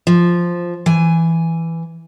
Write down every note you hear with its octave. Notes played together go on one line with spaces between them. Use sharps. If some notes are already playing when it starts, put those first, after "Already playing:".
F3
E3 G#5